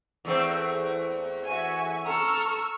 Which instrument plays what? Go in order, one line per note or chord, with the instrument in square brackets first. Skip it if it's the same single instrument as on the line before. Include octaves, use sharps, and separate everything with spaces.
[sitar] E2 A3 C4
[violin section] F#4 E5 G#5
[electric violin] A4 A#5 [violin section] C#6 E6 F6